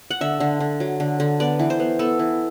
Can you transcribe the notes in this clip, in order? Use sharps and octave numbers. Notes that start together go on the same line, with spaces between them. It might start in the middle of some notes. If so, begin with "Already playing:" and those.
F#5
D3 E5
D3
D3
F#3
D3
D3
B3 D5
E3
C5
B3
B3 A4
E3